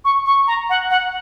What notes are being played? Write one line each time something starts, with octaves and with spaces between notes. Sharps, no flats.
C#6
C#6
A#5
F#5
F#5